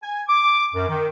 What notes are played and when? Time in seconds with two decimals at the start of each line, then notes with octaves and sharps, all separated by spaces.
0.03 G#5
0.29 D6
0.74 F#2
0.88 D#3